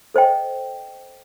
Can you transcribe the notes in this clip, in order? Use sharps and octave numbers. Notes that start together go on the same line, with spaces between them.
A4 C5 D#5 G5